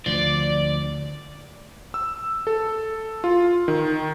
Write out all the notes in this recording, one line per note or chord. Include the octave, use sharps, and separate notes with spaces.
D2 F3 D5
E6
A4
F4
D#3